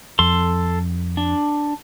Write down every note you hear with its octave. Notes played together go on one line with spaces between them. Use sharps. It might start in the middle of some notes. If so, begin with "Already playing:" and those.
F2 A4 C6
D4